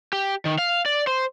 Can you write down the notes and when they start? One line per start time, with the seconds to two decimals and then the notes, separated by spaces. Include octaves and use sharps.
0.13 G4
0.45 D#3
0.59 F5
0.86 D5
1.07 C5